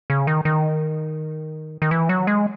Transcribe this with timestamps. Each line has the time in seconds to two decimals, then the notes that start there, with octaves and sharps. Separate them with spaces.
0.10 C#3
0.27 D#3
0.45 D#3
1.82 D#3
1.91 E3
2.09 F#3
2.27 G#3